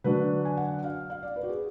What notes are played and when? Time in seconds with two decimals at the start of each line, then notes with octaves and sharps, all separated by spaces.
0.04 D3 F#3 D4 B4
0.45 G#5
0.57 F#5
0.84 F5
1.10 F5
1.23 D5
1.36 B4
1.43 F#4
1.49 G#4